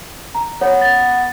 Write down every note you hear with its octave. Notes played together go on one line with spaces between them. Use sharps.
A#5
B3 C#5
A6